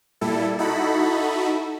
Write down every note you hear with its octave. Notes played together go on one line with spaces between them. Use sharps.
A#2 G3 E4 A4
D#4 E4 F#4 A4 B5